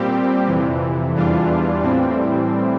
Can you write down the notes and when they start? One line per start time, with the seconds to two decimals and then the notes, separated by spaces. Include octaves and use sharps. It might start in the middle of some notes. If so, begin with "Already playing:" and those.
Already playing: A#2 G3 C4 G4
0.47 F2 C3 E3
1.15 E2 E3 G3 D4 F4
1.83 A2 E3 G3 C4